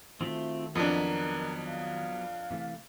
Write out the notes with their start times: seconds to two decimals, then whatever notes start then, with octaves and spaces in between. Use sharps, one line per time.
0.21 D#3 A3 C4 F4 F#4 E5
0.75 F2 F#3 B3 D4 A#4 D#5
1.68 F5
2.51 C3 E3 A3